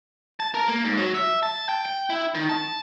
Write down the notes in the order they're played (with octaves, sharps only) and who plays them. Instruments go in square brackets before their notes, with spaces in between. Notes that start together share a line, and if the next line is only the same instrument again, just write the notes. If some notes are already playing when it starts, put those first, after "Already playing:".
[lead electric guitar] A5
A#4
A#3
G#2
F#3
E5
A5
G5
G5
E4
D#3
A5